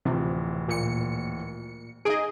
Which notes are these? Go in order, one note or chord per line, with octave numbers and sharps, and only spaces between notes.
D1 C3 E3 F3
A#2 C#7
D#4 G#4 D#5 D#6 D7